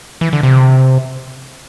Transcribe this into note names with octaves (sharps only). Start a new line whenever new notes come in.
E3
D3
C3